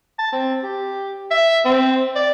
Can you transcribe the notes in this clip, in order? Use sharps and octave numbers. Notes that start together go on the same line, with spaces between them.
A5
C4
G4
E5
C4
D5